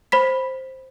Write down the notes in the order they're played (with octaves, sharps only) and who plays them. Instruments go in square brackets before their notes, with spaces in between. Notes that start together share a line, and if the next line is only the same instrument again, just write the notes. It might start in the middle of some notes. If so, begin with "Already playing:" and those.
[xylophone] C5 B5 B6